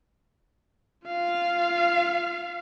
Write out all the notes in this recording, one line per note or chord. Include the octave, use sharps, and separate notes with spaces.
F4 F5